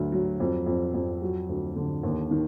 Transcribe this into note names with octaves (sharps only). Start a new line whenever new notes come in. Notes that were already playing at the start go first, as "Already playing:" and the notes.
Already playing: D2 F#3
F#3
F2
F2
F2
F#3 F#4
D2
D3
D#2
D#3